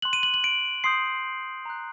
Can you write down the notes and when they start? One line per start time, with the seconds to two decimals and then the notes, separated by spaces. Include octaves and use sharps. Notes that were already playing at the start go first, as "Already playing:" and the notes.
0.02 C6 F#6 F#7
0.13 D#7
0.23 F#7
0.34 F#7
0.44 D7
0.84 C6 D#6 G6 C7
1.65 A#5 F#6